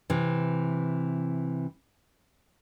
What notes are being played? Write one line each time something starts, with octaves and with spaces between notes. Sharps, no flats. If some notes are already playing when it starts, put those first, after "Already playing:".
C3 E3